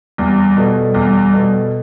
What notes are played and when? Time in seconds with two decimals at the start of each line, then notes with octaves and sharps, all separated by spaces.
0.18 E2 G3
0.57 B2 A3
0.94 E2
1.32 B2 A3